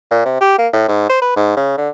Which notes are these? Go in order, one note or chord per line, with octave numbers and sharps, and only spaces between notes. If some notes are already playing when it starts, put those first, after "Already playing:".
A#2
C3
G4
A#3
A2
G#2
C5
B4
G#2
C#3
D3